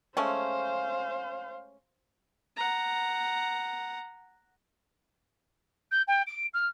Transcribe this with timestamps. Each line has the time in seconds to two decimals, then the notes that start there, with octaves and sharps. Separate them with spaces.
0.17 G#3 A3 C#4 C5 F5
2.57 F#5 A#5
5.91 G6
6.07 G5
6.27 D7
6.54 F6